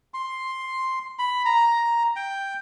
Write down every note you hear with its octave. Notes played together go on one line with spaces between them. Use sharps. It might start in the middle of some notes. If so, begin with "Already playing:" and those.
C6
B5
A#5
G5